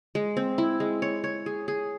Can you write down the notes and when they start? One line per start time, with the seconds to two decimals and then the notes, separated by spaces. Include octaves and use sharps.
0.15 G#3
0.37 C4
0.58 E4
0.80 G#3
1.02 C#5
1.24 C#5
1.46 G#4
1.68 G#4